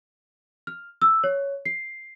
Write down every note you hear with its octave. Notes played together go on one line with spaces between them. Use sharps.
F6
E6
C#5
C7